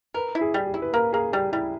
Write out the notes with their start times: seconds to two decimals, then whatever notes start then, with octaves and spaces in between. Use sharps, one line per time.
0.14 A#4 B4
0.35 E4
0.41 G#4
0.54 G3
0.67 G4
0.74 E4
0.82 B4
0.93 A#3 A#4
1.13 A#3 G#4
1.33 G3 G4
1.52 G3 E4